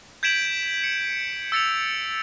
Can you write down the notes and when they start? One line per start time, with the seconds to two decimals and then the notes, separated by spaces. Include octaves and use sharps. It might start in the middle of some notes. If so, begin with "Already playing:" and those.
0.23 G6 G#6 B6 D7 E7 F#7
0.84 C#7
1.52 E6 A6 C#7 F7